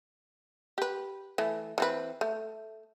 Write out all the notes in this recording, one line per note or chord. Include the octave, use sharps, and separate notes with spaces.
G4 B4
E3 A3
E3 C4 B4
A3